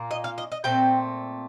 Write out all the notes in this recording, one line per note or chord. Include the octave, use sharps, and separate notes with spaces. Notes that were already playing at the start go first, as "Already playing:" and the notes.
Already playing: A#2 A#3
D#5
F5
D#5
D#5
A#2 A3 C4 G5